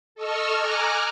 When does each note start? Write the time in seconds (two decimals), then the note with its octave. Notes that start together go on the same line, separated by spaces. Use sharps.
0.15 A4 D#5 C#6 E6 F6
0.56 G#5 A#5 D6 F6 F#6